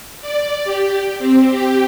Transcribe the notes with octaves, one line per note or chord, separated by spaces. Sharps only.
D5
G4
C4
G4